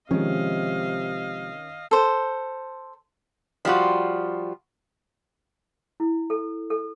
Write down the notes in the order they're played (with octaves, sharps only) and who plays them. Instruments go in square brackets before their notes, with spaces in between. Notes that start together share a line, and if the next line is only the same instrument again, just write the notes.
[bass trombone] C3 [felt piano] D#3 C#4 [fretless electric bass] F3 G#3 [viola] D#5 F5
[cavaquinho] A4 C5
[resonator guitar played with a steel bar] F3 G3 F4 F#4
[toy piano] E4
A4
A4